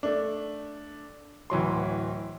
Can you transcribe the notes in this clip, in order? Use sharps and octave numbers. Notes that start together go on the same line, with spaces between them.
A3 D4
D1 E3 F#3 C6